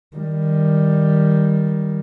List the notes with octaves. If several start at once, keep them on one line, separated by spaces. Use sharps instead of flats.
D#3 G3